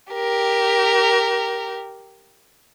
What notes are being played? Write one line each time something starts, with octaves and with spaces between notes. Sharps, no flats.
G4 A#4